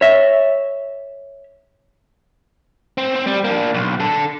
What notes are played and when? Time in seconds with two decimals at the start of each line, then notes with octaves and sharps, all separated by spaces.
0.01 C#5 E5
2.98 C4
3.16 C4
3.27 G3
3.44 A#3 D4
3.74 B1
4.00 D3 A4